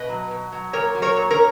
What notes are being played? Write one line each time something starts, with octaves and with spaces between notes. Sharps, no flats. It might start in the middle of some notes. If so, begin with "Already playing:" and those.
Already playing: B2 B4 D#5
F#3
B2
F#3
A#2 A#4 C#5
F#3
A#4 C#5
A#2
A#4 C#5